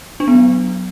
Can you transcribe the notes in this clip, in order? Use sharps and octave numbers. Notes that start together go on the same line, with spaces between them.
D4
B3
F#3